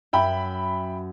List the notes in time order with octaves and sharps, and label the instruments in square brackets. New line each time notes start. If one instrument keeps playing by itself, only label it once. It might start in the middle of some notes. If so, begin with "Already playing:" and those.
[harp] F#2 [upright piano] E5 G5 B5